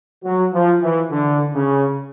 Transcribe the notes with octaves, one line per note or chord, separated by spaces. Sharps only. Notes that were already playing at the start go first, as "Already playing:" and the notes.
F#3
F3
E3
D3
C#3